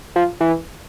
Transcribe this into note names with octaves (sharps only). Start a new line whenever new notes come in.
F3
E3